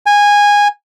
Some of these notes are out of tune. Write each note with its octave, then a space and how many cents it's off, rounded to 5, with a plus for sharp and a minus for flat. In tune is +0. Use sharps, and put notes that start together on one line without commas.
G#5 -15